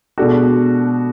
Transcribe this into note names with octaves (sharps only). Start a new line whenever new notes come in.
B2 G#3 D4 F#4 A4